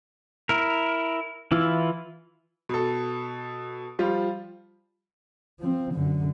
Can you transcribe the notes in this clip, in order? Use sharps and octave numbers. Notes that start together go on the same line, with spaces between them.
E4 A#4
E3 E4 F4
B2 A4
F3 G3 F4
F3 C4
F#2 D3